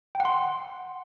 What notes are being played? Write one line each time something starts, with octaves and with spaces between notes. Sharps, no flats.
G5
F#5
C6